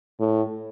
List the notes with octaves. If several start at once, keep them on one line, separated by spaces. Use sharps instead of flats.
A2